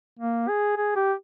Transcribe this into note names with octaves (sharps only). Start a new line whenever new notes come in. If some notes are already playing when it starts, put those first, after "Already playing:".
A#3
G#4
G#4
G4